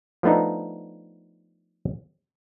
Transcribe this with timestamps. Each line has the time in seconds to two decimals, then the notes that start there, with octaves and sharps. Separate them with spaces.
0.23 F3 A3 B3 D4 D#4